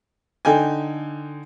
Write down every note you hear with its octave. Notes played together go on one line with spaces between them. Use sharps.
D3 D#4 G5 G#5